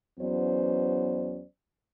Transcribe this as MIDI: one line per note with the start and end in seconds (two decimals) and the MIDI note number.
0.20 1.43 40
0.20 1.43 54
0.20 1.43 59
0.20 1.43 61
0.20 1.43 72
0.20 1.43 74